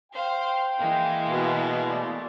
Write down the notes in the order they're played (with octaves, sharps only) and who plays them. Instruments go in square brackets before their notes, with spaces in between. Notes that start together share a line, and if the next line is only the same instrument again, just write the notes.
[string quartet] C5 F5 [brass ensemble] G5
[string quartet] E3 G#3 A#3
[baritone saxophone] B2
[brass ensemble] A3 D5